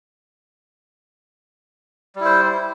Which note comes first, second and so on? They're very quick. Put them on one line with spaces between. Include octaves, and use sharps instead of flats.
G3 E4 C5